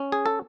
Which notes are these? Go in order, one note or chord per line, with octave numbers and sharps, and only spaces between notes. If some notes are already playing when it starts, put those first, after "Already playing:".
Already playing: C#4
G#4
A4